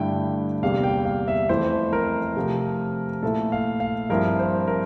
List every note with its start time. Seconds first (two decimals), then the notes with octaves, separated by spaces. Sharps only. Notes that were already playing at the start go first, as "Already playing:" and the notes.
Already playing: G2 D3 A3 E4 G5
0.62 E2 C3 G3 A#3 F5
0.84 G5
1.05 F5
1.28 E5
1.49 F2 E3 A3 E4 C5
1.93 A#4
2.36 C3 F3 A3
3.23 A#2 A3 E4 A4
3.52 F5
3.80 F5
4.09 G2 F3 C4 E4 A#4
4.39 C5
4.67 A#4